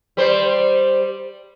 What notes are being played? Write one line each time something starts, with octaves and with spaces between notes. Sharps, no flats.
G3 C5